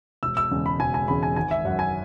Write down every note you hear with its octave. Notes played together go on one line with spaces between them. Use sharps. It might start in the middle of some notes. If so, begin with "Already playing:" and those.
E1 E6
E6
E2 C#3 G#3
B5
E1 G#5
G#5
E2 C#3 G#3 B5
G#5
G#1 G#5
E5
F#2 F#3 F#5
G#5